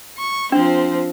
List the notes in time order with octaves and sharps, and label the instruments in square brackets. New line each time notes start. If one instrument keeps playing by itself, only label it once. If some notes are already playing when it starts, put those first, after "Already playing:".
[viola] C#6
[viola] F3 C4 [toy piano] D4